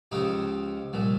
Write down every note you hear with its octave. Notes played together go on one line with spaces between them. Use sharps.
C#2 C#3 F3 D#4 G4
C2 A#2 F3